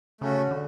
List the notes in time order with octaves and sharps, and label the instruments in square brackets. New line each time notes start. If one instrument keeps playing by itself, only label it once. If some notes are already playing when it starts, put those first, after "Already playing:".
[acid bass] C#3 [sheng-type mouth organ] A3 C#4 F#4
[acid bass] D3